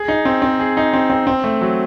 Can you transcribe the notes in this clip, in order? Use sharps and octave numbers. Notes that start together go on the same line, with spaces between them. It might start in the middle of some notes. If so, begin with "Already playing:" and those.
Already playing: G#4
D#4
C4
C4
G#4
D#4
C4
C4
C4
A3
F#3